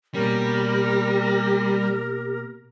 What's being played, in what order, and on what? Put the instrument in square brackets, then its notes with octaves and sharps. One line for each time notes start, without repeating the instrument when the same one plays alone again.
[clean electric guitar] B2 A#3 C#4 [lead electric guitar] G3 [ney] G4 [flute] A#4